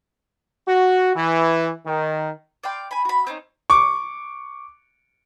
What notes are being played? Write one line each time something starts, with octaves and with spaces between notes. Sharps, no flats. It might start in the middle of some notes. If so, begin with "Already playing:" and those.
F#4
E3
D#3
D5 F5 G5 C6
G#5 B5
F#4 B5
C4 C#4 D#4
C#6 D6